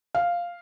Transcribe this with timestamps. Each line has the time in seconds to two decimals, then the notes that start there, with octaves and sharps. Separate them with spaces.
0.15 F5